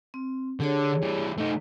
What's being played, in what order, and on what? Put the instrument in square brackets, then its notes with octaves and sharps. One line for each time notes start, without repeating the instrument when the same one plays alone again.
[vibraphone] C4
[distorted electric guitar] D3 [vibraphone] G4 G#4 C#5
[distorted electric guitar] E3 G3
A3 D#4